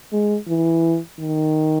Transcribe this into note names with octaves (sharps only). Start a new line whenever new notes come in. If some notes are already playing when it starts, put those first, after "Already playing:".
G#3
E3
D#3